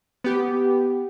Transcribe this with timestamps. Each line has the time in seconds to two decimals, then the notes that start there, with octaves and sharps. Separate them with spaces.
0.24 B3 G4